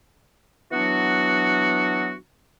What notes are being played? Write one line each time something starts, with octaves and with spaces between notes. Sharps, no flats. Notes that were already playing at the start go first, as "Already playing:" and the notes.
E3 F#3 B3 D4 F#4